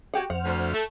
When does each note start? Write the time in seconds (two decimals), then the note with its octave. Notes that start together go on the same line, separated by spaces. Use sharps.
0.14 F#4 G4 F#5 G#5
0.30 F2 C5 F#5 F6
0.45 D2
0.73 A3